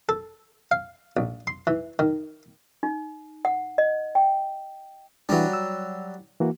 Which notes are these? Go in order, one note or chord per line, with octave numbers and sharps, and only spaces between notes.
A4
F5
A#1
C6
E3
D#3
D#4
F#5
D#5
G5
E3 F#3 G3 D4
E6
E3 A#3 F#4